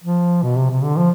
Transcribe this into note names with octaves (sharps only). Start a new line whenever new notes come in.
F3
B2
C3
C3
D3
F3